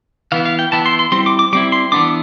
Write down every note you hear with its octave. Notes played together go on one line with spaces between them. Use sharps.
E3 B3 E4 F5
F5
G5
E3 B3 E4 A5
C6
C6
G3 C4 E4 C6
D6
D6
G3 C4 E4 D6
C6
E3 B3 D4 D6